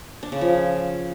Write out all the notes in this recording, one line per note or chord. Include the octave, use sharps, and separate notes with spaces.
D4
C#3
F3